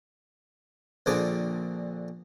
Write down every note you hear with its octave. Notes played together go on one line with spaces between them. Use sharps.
A#1 A#2 D3 C4 G#4 D6